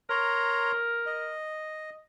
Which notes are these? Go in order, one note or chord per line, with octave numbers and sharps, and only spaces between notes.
A#4 C#5 A#5 C6
D#5